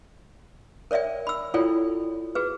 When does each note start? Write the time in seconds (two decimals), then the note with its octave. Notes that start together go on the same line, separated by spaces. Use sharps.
0.91 A#4 C#5 D5 E5 G5
1.27 B5 E6
1.54 E4 F4 A4 C#5 D5 G5
2.35 F#4 G#4 B4